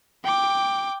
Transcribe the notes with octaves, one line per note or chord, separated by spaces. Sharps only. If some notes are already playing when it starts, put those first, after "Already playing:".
G5 D6